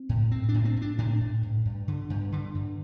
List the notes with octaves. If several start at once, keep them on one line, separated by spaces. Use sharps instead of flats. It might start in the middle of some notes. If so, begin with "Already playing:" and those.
Already playing: C4
A2
A2 C4
D4
A2
C4
A2 D4
A2 D4
A2
A2
G2
D3
G2
D3
G2